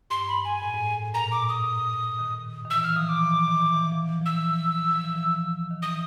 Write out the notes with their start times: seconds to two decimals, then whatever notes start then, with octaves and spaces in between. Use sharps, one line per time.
0.10 G2 C6
0.28 B5
0.45 G#5
0.62 A2
0.74 G#2
0.86 A2
1.14 A#2 A#5
1.32 D6
1.49 D#6
2.19 D#3
2.65 D#3
2.70 E3 E6
2.83 E3 F6
2.96 F3 D#6
3.09 E3 D6
3.22 D#3
3.35 E3
3.48 D#3
3.61 E3
3.74 E3
3.92 F3
4.09 E3
4.21 F3 E6
4.33 E3
4.91 F3
5.04 E3
5.16 F3
5.71 D#3
5.82 E3 D#6